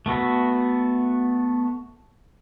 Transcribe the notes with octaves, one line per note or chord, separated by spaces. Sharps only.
A3 B3 F#4 E5